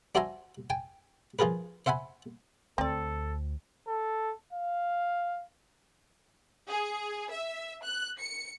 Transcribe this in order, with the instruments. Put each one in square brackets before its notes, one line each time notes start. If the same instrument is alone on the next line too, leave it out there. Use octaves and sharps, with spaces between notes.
[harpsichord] D4 F#4 C5 E5 G#5 A#5
G5 G#5
F3 F4 G#4 A#4 B4
C5 E5 F#5 G#5 B5
[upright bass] D2 [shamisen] C4 D5 [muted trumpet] A4
[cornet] A4
F5
[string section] G#4
E5
F#6
C#7